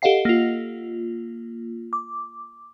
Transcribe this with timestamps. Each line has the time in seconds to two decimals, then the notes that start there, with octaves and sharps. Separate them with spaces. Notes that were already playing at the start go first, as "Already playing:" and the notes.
0.02 G4 A4 D#5 F5 F#5 C7
0.25 A#3 F4
1.93 D6